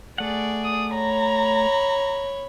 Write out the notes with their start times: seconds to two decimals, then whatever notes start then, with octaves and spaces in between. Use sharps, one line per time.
0.18 A3 G#4 D5 F#5
0.64 D#6
0.94 C#5 A#5 B5